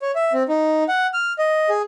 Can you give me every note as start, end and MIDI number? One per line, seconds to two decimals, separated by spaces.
0.02 0.11 73
0.15 0.33 76
0.33 0.43 60
0.49 0.84 63
0.88 1.07 78
1.14 1.33 89
1.39 1.69 75
1.69 1.82 68